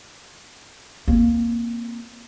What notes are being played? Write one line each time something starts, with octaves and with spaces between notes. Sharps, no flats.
A#3 C4